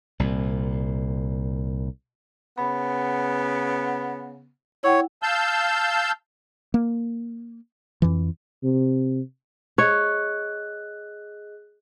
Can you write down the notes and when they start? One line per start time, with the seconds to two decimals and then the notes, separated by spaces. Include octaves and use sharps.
0.20 C2 A#2
2.58 C#3 B3 B5
4.84 E4 C#5 F#5 G5
5.23 F5 A5 E6 G6
6.74 A#3
8.02 F2 E3
8.64 C3
9.78 G#4 C#5 D#5 F#6